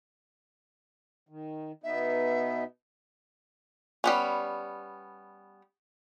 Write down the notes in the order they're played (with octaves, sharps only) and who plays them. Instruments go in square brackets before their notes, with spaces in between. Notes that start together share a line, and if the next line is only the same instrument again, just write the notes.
[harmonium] D#3
[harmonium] B2 B3 D#4 [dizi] E5
[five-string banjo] G3 B3 C#4